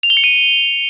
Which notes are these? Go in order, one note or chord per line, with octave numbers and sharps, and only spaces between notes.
F7
G7
C#7
D#7